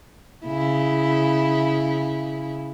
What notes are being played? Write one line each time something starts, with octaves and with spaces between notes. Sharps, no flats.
C#3 E4